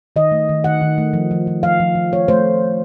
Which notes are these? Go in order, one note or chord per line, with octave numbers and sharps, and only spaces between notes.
D#3 D#5
A3
D#3
D#3 F#5
D#3
A3
F3
F3
F3
F3 F5
F3
F3
A3 C#5
A3 C5